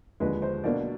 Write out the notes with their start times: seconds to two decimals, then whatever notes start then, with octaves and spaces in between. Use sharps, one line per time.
0.20 D#2 D3 F3 G#3 B4
0.42 C5
0.64 B2 F#3 A#3 D4 D5